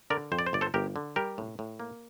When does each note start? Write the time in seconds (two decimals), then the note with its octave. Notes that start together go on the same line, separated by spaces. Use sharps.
0.10 D3 A#4 D5
0.32 F2 C5
0.39 D5
0.47 C5
0.53 G1 D5
0.61 A4 C5
0.74 G1 G4 A#4
0.96 D3
1.16 G3 G4 A#4
1.38 A2
1.59 A2
1.80 A#3